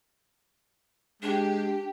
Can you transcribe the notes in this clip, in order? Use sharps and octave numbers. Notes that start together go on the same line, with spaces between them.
G#3 D4 G4